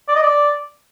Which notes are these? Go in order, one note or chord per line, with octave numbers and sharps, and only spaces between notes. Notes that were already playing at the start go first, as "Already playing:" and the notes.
D5
D#5
D5